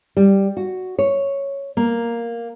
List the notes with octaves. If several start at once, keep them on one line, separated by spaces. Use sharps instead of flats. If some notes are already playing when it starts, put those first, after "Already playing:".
G3
F#4
C#5
A#3